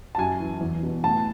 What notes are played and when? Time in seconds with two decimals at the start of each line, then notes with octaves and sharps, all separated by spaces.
0.15 A5
0.18 F#2 G#5
0.40 E3
0.61 E2
0.83 B2
1.04 A2 A5